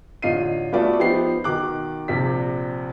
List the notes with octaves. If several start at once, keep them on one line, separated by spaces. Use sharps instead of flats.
A1 D3 F4 D#5 C7 D#7
A3 B3 F4 F#4 D5 E5
F3 B3 D#4 G4 C5 C7
B2 D#3 D6 F#6
A#1 C3 D5 B6